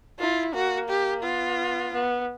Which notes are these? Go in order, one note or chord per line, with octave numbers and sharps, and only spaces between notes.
E4 F4
A#3 F#4
G4
B3 F4
B3